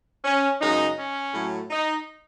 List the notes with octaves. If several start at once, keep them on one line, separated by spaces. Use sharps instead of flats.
C#4
F#2 C#3 G#3 D#4
C#4
A2 F#3 A3
D#4